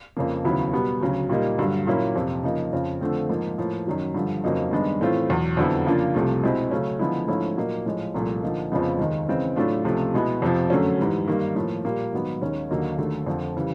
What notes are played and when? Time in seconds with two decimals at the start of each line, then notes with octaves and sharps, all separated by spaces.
0.17 F2 C#3 F3 A#3
0.45 D#2 C#3 F#3 B3 E4
0.73 B2 G3 B3
1.01 D2 C#3 F#3
1.29 A#2 G3 A#3 D#4
1.58 G2 D3 F#3
1.87 A#2 F#3 A#3 C#4 E4
2.15 F2 C3 F3
2.43 C#3 F3 A#3 D#4
2.72 F2 C#3 F3
3.01 D3 F3 A3 C4
3.29 G#2 F3 A#3 D#4
3.58 A2 F3 A#3
3.87 F#2 D#3 F#3
4.15 G2 D3 F3
4.44 F2 C#3 F#3 A#3 D#4
4.71 G2 D#3 G#3 B3 D4
5.01 A2 E3 A3 C4 F4
5.29 E2 B2 F#3
5.57 F2 D3 F#3 B3 E4
5.86 C#3 F3 A#3 D4 F4
6.14 C2 C3 F3 A3
6.43 B2 G#3 C4 E4
6.71 C#3 F#3 A3 C#4
6.99 D3 F3 G#3 B3 E4
7.28 G#2 F3 A3 C#4 E4
7.57 A#2 F#3 A#3 D#4
7.86 A2 F3 G#3
8.14 C2 A#2 F3 A3
8.43 D3 F3 A#3 D#4
8.72 F2 C#3 F3 G#3 B3
8.99 D#2 D#3 G#3
9.28 C#3 E3 G#3 C4
9.56 A2 F#3 A3 D4 F4
9.85 C#2 C3 F3 A3
10.14 B2 G#3 B3 E4
10.42 F2 C3 F3
10.70 F#2 D3 F#3 A3 C#4
10.98 G#2 E3 G3
11.27 G2 D#3 G3 A#3
11.55 A2 F3 A#3
11.85 A#2 G3 A#3
12.13 G#2 D#3 F#3 B3
12.41 D#2 D#3 G#3 C#4
12.70 D#2 D3 F#3 A#3 D#4
12.98 D#2 D3 F#3 A3
13.27 F2 D3 F3
13.57 C#3 E3 G3